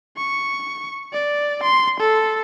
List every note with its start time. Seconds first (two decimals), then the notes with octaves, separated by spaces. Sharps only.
0.17 C#6
1.13 D5
1.63 C6
2.00 A4